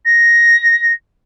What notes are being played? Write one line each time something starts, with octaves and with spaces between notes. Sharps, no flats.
A#6